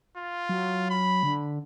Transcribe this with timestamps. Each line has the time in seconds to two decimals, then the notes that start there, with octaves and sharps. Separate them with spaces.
0.17 F4
0.49 F#3
0.90 B5
1.23 D3